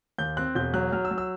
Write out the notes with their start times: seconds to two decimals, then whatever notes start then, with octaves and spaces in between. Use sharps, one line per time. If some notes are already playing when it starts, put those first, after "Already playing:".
0.18 D#2 G6
0.37 C4 F#6
0.55 E1 G6
0.73 F#3 F#6
0.92 F#3 F6
1.05 E6
1.11 F#3
1.18 E6